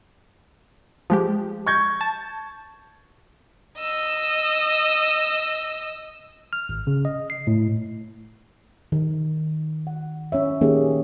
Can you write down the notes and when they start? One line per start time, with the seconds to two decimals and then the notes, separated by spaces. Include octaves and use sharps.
1.10 F3 G#3 G4
1.66 C#6 G6 G#6
2.01 A5
3.76 D#5 E6
6.53 F6
6.69 G#1
6.87 C#3
7.05 D#5
7.30 C7
7.47 A2
8.92 D#3
9.87 F#5
10.32 C#4 C#5 E5
10.61 D#3 A#3 C#4 D#4 G4 G#4